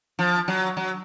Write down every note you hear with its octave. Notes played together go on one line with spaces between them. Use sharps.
F3
F#3
F#3